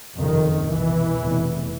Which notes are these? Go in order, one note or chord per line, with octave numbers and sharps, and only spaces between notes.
F#1 F2 C3 D#3
C2 B2 E3
F1 E2 B2